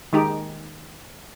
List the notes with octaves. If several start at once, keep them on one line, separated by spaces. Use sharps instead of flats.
D#3 G#3 D#4 G4